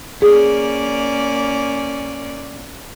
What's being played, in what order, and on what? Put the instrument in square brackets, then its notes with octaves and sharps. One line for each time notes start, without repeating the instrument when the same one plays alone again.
[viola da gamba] A#3 C#4 D5 [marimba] G#4